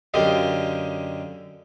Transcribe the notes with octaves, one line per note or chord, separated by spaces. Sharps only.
F#2 D3 G4 D#5 F5